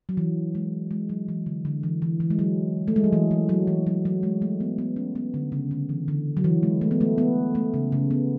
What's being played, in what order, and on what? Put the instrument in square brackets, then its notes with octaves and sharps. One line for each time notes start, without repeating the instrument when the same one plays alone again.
[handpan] F#3
E3
G#3
G#3
F#3
E3
D3
D3
E3
E3
E3
G#3
F#3
A3
G#3
F#3
E3
E3
F#3
E3
F#3
F#3
G#3
A3
B3
B3
C#4
B3
D3
C#3
D3
E3
D3
F#3
E3
G#3
A3
B3
A3
B3
A3
C#3
C#3
B3